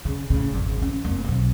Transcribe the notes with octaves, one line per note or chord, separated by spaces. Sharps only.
C#3
A2 C#3
G#1 F2
E3 C#4
F1 A#3
B1 C3